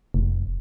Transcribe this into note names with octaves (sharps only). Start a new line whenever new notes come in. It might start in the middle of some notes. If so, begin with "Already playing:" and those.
F1